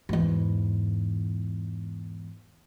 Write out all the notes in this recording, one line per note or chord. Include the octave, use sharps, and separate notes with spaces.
E2 G#2